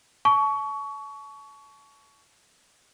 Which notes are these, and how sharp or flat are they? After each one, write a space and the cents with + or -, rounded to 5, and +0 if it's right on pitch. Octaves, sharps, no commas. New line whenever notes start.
A5 -30 C#6 +25